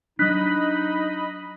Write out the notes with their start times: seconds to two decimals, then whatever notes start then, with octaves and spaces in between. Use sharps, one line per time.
0.19 F#3 D4 D#4 D#5 B5 F#6 B6